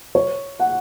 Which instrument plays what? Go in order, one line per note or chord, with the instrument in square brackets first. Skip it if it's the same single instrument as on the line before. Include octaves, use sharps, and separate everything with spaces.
[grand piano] C#5
F#5